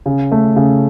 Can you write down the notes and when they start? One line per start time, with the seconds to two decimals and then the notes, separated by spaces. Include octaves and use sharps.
0.06 C#3
0.32 A3
0.56 C#3